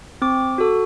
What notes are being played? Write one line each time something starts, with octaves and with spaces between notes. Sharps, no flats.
C4 D6
F#4 A4